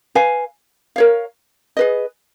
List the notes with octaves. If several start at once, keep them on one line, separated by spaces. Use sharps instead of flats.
B4 F5 G#5
A#4 C#5 F5
G#4 B4 D#5